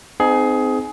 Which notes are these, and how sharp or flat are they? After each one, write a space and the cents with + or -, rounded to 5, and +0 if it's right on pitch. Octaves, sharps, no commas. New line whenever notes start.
C4 -30 D#4 -20 G#4 +20